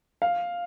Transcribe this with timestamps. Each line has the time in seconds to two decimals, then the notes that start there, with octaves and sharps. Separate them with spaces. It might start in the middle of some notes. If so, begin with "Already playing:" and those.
0.22 F5